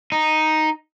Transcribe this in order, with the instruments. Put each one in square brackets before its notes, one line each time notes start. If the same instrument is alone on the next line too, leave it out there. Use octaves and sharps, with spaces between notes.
[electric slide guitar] D#4